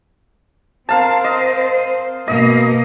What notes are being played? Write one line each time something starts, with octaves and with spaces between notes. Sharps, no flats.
C4 A#4 C5 F5 A5
D#5
B2 A#3 D#5